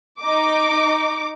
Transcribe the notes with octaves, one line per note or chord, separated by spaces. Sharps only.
D#4 D6